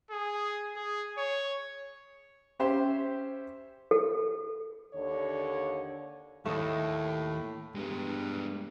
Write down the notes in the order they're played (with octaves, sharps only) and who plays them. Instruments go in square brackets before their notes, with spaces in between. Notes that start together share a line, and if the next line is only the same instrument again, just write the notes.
[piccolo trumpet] G#4
G#4
C#5
[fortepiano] C#4 G4 C5 E5 C6
[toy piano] A4
[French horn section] D#2 D3 C#5
[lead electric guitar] D#2 [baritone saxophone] A2 [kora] A3 A4 D#5
[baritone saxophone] G2 [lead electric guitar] G#3 B3